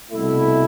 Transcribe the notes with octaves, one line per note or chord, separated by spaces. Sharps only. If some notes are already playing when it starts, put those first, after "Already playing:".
C2 B2 A3 E4